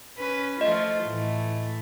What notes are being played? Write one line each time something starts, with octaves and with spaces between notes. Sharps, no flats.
C#4 B4
F3 A3 F4 D#5
A2 E3 A3